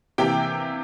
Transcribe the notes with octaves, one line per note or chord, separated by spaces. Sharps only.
C3 E3 A#3 G4 G5